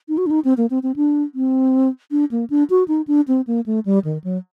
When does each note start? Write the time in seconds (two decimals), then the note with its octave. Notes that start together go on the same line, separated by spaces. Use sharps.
0.09 D#4
0.18 F#4
0.26 D4
0.31 D#4
0.45 C4
0.57 A#3
0.70 C4
0.83 C4
0.96 D4
1.35 C4
2.11 D4
2.31 A#3
2.50 D4
2.70 F#4
2.88 D#4
3.07 D4
3.28 C4
3.47 A#3
3.66 A3
3.85 G3
4.05 D#3
4.24 F#3